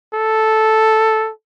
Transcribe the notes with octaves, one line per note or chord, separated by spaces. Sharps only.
A4